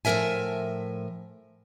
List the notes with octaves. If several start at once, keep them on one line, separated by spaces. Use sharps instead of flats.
A2 F3 B3 A#4 E5 G#5